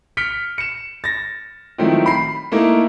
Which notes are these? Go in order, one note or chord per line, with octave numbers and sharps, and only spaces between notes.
F6 B6 C#7 D7 G7
C#7 E7
A6 A#6
D#3 F3 F#3 A3 C4 E4
B5 C7
A3 A#3 D#4 E4 A4 A#4